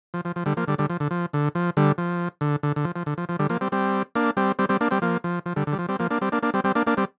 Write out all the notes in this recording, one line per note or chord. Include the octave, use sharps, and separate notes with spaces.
F3
F3
F3
D3 G3
F3 A#3
D3 G3
D3 G3
F3
D3
F3
D3
F3
D3 G3
F3
D3
D3
D3
F3
F3
D3
F3
F3
D3 G3
F3 A#3
G3 C4
G3 C4
A#3 D4
G3 C4
G3 C4
G3 C4
A#3 D4
G3 C4
F3 A#3
F3
F3
D3 G3
D3
G3
F3
G3 C4
F3 A#3
A#3 D4
G3 C4
A#3 D4
A#3 D4
G3 C4
G3 C4
A#3 D4
A#3 D4
G3 C4